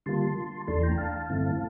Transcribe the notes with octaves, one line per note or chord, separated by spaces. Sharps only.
D3 G3 A#3 F4 A5 C6
E2 E3 A3 D4 A5 C6
G5 A#5
F5 A5
G2 D3 A3 C4 E4